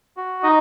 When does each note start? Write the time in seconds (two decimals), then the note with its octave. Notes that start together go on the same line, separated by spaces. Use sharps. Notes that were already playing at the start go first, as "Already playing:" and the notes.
0.17 F#4
0.43 D#4 D#5